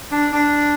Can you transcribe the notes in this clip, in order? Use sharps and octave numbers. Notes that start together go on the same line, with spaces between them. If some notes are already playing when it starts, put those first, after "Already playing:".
D4
D4